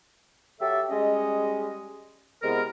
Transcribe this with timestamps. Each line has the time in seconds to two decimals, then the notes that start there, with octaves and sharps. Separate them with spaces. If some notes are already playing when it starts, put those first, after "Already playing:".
0.60 F#3 G4 A4 E5
0.90 G3 G#3 C#4 D#5
2.43 C3 G#3 B3 E4 A#4